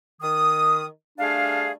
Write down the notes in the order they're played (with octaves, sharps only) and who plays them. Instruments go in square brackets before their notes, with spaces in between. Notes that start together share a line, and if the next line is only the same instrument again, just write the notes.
[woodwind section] D#3 D#6
G3 A3 D4 G#4 F5